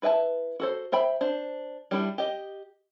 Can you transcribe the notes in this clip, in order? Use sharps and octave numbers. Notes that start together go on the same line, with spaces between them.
E4 B4 E5 G#5 A5
F#4 A4 C5
C5 E5 G5 B5
D4 C5
G3 D4 E4 G4
G4 D#5